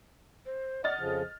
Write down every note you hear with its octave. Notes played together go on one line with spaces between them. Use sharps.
C5
D5 D#5 F#5 F6 A6
F2 C#3 F3